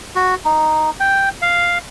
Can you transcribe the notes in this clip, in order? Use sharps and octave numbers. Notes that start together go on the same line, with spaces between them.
F#4
D#4
G5
F5